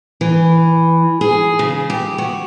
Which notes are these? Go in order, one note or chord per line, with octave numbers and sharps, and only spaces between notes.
E3
G#4
C#3
G4
F#4